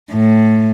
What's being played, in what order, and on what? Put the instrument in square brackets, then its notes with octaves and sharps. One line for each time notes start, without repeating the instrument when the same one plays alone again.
[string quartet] A2